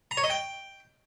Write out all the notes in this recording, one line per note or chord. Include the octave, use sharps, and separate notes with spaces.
A#5
C#5
D#5
G5